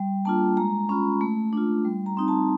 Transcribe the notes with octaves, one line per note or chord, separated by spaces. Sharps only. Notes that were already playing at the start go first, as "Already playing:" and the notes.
Already playing: G3
A#3 D4 F4 A5
G#3 A#5
C#4 F4 B5
A3
D4 F4
G3
A#5
C4 D#4
A5